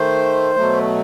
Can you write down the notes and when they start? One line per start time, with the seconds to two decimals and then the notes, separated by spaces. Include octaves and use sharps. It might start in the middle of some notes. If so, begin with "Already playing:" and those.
Already playing: D#3 A3 C5
0.56 B2 F#3 A3